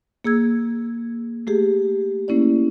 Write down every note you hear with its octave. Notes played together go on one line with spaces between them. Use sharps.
A#3 G#4 E6 G#6
A3 G4 G#4
A3 A#3 C#4 E4 D5